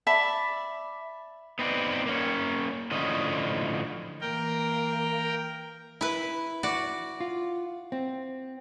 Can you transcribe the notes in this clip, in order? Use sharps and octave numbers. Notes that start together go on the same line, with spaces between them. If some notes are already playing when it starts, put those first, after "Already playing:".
D5 E5 A5 B5
B3 C4 D#4 B4 D5
A#3 C#4
A2 D3 F3 C#4 D#5
E3 A#3 A#4 G5
E4 B4
F#4 D5
F4
C4